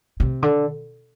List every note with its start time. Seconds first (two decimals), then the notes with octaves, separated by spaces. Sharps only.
0.20 C3
0.43 D3